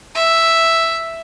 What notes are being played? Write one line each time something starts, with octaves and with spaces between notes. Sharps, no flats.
E5